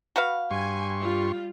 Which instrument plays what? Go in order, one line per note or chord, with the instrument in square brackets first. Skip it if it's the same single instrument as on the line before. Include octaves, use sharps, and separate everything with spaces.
[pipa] F#4 B4 F5
[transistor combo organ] G2 C6 C#6 [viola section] G#5
[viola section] G3 F4